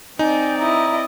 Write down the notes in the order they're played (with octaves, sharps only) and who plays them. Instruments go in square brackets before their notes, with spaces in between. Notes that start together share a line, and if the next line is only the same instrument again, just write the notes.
[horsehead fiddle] C4 D5 [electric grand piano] D#4 [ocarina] G#5
[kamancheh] E4 D#5 [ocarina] A#5